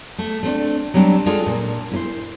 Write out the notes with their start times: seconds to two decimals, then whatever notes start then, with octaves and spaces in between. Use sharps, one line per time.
0.18 A3
0.43 A3 C4 D4
0.94 F#3 G3 C4 D4
1.26 G#3 D4 F4 A4
1.46 A#2
1.92 E4 B4 C5